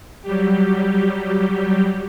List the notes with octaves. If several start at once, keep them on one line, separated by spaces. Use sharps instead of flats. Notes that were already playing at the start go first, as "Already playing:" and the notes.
F#3 G3 G4